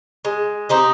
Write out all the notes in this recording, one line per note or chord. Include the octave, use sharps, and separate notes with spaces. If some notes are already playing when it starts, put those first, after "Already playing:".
G#3
C4 D#4 G4